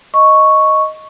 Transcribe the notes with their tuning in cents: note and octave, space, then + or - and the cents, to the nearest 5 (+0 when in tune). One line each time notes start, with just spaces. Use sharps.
D#5 +0 C#6 +0